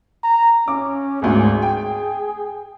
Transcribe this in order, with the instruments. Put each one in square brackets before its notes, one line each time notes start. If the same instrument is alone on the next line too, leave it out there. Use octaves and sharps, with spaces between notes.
[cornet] A#5
[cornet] C#4 [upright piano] D6
[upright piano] G#1 D2 G#2 [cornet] G#4
[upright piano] G5